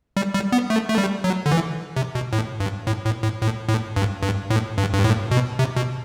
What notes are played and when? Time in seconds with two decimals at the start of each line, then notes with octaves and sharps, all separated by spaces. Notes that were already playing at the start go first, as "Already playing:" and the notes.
0.17 G3
0.34 G3
0.52 B3
0.70 A3
0.89 A3
0.98 G3
1.24 F#3
1.46 D3
1.51 E3
1.96 C3
2.15 B2
2.33 A2
2.60 G2
2.87 A2
3.05 A2
3.23 A2
3.42 A2
3.69 A2
3.96 G2
4.23 G2
4.50 A2
4.78 G2
4.93 G2
5.04 A2
5.31 B2
5.59 C3
5.76 B2